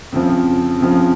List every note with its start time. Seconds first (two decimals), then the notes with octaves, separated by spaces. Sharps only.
0.12 F2 C#3 F3
0.81 F2 C#3 F3